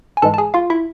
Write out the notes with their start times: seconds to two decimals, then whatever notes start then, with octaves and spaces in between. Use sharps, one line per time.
0.17 G#5
0.22 G#2 E3 G#3 A4 A5
0.34 A5
0.38 G#4 G#5
0.54 F4 F5
0.70 E4 E5